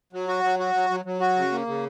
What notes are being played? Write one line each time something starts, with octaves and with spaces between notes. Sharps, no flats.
F#3
F#4
F#3
F#4
F#3
F#3
F#3
F#4
C#3
A#3
C#3